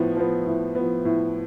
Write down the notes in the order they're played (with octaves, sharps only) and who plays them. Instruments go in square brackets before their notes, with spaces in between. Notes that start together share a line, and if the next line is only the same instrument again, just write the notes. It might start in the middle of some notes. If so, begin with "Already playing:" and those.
Already playing: [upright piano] A2 F3 B3
F3 B3
A2
F3 B3
A2